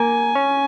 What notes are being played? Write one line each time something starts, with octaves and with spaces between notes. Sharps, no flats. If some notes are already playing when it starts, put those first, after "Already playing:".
Already playing: A#3 G#5
C#4